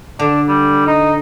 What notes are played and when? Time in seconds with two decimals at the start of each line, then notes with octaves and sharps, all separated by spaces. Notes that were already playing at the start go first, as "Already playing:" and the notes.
0.19 D3 D4
0.48 G3
0.87 D#4